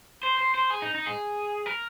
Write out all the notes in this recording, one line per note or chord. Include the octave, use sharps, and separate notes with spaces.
C5
C5
C5
G#4
D#4
D#4
G#4
A#4